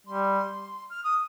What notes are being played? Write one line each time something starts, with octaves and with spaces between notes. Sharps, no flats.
G3 C6
F6
D#6